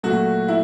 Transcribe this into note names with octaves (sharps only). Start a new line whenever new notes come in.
A#2 F#3 A3 F#4
E4